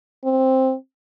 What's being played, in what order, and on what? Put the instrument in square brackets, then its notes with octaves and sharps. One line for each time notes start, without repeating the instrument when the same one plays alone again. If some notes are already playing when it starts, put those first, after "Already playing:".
[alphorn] C4